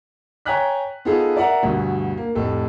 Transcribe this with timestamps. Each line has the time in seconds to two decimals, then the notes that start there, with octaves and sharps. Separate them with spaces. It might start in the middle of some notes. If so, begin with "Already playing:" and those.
0.46 C#5 G5 G#5 A#5 F#6 B6
1.05 B3 D#4 F4 G#4 A4 B4
1.36 A#4 D5 E5 F#5 A#5
1.63 D2 G2 B2
2.17 A#3
2.35 F1 A2 A4